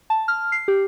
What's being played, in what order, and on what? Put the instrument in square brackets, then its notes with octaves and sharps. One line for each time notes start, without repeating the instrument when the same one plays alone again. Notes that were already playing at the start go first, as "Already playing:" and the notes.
[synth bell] A5
F6
C7
G4